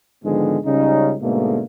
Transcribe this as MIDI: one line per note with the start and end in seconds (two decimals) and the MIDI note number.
0.24 0.58 44
0.24 0.58 50
0.24 0.58 51
0.24 0.58 53
0.24 0.58 56
0.24 0.58 59
0.66 1.15 37
0.66 1.15 49
0.66 1.15 55
0.66 1.15 61
0.66 1.15 63
1.22 1.62 44
1.22 1.62 47
1.22 1.62 50
1.22 1.62 57
1.22 1.62 58